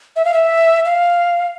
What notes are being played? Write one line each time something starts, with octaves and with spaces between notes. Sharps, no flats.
E5
F5
E5
F5